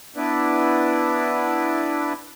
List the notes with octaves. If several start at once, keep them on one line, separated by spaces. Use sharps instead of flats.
B3 D4 E4 B4 D5